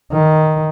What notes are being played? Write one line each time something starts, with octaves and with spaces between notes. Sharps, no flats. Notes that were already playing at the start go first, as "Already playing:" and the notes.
D#3